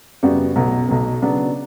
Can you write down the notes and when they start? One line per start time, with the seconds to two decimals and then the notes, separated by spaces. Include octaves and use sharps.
0.23 F#2 C#3 G3 B3 F#4
0.56 B1 B2 F#3 B3
0.88 B1 B2 F#3 B3
1.22 C#3 F#3 B3 D4